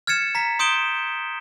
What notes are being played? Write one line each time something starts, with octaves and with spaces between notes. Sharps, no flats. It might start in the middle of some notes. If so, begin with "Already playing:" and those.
F6 G#6 A6 C#7 E7
A#5 B6
C6 D#6 G6 D7 E7 G7